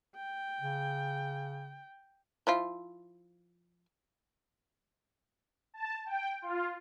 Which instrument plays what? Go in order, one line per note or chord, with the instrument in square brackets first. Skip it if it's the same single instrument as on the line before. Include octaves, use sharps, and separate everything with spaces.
[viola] G5
[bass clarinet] C#3
[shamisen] F3 E4 F4
[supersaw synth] A5
G5
F4